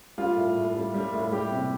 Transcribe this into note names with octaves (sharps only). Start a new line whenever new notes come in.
G3 F4
A2
A2
G3
G3
A2
G3 G4
C3